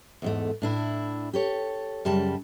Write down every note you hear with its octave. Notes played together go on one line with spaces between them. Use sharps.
E2 G#2 A3
A2 D4 E4
G4 A4 C#5
F#2 C#3 G3 A5